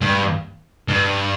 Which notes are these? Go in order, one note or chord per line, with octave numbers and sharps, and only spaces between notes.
G2
G2